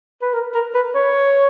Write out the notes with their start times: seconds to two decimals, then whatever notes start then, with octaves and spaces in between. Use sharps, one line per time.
0.22 B4
0.34 A#4
0.54 A#4
0.75 B4
0.95 C#5